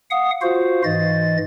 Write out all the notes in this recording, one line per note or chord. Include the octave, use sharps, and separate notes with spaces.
F5 F#5 D#6
F4 F#4 C5 F5
G#2 E3 D#5 A6